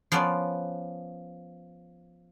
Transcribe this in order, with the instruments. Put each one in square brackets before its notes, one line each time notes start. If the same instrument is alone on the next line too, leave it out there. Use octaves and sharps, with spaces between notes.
[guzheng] F3 B3 C#4 D5